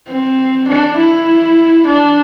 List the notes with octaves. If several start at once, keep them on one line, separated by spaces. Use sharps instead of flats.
C4
D4
E4
D4